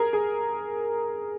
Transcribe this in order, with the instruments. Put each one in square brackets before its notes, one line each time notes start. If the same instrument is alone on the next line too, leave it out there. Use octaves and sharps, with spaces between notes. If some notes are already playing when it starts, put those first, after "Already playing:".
Already playing: [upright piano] G#4 A#4
G#4